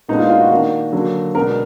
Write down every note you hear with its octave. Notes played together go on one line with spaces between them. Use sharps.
A#2 G#3 B3 D4 D#4
F4
F4
F#4
D#3 A#3 D4
D3 F#3 A#3
B2 G#3 B3 D4 A#4